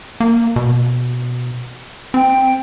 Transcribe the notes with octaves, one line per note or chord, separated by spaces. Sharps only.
A#3
B2
C4 G5